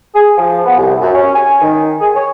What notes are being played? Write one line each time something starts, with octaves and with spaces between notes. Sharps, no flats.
G#4
F3
B3
C2
F#2
C#4
G#5
D#3
G#4
C#5